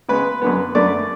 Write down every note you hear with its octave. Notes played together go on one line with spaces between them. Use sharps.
C#3 G#3 B3 B4
F#2 D3 G#3 B3
F#2 D3 A3 D5